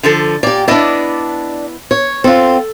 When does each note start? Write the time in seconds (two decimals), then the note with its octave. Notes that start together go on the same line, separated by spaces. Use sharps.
0.03 D3 F3 A4
0.43 A#2 G4 D5
0.68 B3 D4 E4 D5 D#5
1.91 C#5
2.24 C4 F4 A4